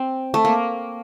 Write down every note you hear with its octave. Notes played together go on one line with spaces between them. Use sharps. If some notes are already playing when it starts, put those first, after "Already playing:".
Already playing: C4
A3
A#3